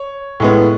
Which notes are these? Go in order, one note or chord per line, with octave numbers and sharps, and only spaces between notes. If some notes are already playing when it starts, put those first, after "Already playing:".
Already playing: C#5
A2 G#3 B3